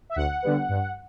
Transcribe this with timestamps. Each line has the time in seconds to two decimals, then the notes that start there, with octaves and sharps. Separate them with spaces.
0.10 E5
0.16 D2 F#5
0.42 D3 G3 B3
0.69 G2